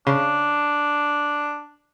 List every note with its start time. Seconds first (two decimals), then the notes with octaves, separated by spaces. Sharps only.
0.07 C#3 D4